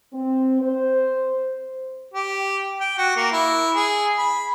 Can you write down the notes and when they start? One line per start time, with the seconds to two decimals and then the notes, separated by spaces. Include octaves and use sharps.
0.13 C4
0.62 C5
2.14 G4
2.80 G5
2.98 F#4
3.16 A#3
3.32 E4
3.75 G#4
4.18 B5